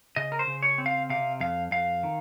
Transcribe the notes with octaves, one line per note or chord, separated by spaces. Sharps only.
C#3 D#5
A#4
C5
C#3
C#5
C4
F5
C3 F5
F2 F5
F2 F5
D#3